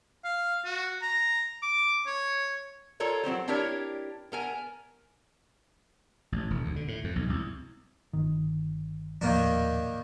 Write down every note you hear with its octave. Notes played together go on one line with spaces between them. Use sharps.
F5
F#4
A#5
D6
C#5
F4 A4 A#4 C#5 D5
F#3 C4 G4 C5
C4 D4 E4 G4 A#4 C#5
B3 A#4 G#5
A1
E1
D2
D3
A2
F2
B1
C2
G1 D#3
D#1 A2 D#3 F3 A#3 D4